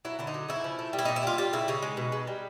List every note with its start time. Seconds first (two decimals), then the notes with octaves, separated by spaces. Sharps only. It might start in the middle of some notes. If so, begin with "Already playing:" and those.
0.05 F#3 E4
0.19 D3 E4
0.27 D#4
0.34 F#3
0.48 C#3 E4
0.64 F3
0.79 A3
0.93 G3
0.99 E4
1.05 A#2 D#4
1.16 E4
1.23 G3 F4
1.38 G3 F4
1.53 C#3 E4
1.68 C#3 D#4
1.82 G#3
1.97 B2
2.12 G#3
2.27 G3